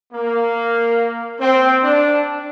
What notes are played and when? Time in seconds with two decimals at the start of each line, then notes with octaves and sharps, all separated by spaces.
0.13 A#3
1.40 C4
1.83 D4